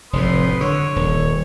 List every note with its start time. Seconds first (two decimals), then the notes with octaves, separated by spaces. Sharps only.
0.13 F1 A2 B4 C6 D#6
0.61 D3 C#5
0.96 D#1